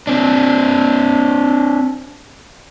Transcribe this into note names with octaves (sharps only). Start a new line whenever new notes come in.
C4 D4